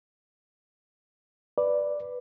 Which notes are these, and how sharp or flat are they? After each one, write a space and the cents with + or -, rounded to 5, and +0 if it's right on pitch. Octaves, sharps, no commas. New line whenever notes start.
B4 +0 D5 +0